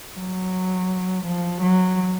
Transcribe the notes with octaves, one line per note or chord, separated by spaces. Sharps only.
F#3
F3
F#3